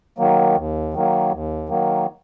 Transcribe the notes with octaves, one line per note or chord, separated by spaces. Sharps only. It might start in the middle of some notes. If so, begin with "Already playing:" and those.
D#3 F#3 A#3
D#2
D#3 F#3 A#3
D#2
D#3 F#3 A#3